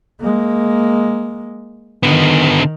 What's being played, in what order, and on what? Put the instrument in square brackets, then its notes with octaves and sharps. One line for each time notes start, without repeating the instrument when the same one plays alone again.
[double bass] G#3 A#3
[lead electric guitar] D3 B3 [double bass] D#3